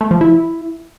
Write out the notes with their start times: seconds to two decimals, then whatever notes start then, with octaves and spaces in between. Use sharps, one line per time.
0.01 A3
0.11 F3
0.21 E4